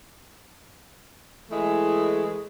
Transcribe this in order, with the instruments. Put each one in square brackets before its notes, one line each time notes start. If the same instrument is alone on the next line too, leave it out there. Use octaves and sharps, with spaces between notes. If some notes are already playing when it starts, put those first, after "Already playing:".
[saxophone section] E3 G#3 A3 E4 G#4